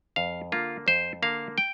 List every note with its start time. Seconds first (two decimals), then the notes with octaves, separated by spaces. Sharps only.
0.16 F2 F5
0.52 D3 A#3 F4
0.86 F2 C5
1.23 D3 A#3 F5
1.58 G5